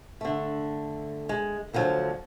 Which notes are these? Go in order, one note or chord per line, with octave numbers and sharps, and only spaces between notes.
D3 A3
G#3
D2 D3 F3 F#3 A5